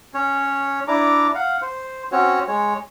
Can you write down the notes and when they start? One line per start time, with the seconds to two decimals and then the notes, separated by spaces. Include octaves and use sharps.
0.14 C#4 C#5
0.88 D4 E4 A#5 D6
1.35 F5 F#5
1.62 C5
2.12 C4 C#4 F#4 C#5
2.48 G#3 C#5